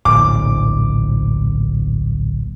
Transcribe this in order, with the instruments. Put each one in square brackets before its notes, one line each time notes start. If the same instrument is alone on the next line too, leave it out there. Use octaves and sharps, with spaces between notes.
[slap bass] D1 A#1 [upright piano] D6